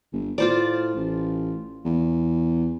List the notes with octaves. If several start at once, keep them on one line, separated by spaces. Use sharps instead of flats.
G1
A2 F4 C5 D5
A1
E2